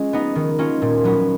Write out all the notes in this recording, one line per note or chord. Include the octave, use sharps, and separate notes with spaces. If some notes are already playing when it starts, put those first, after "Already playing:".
Already playing: G#3 C#4 F4
B3 D#4
D#3
A#3 C#4 F4
A#2
F#3 B3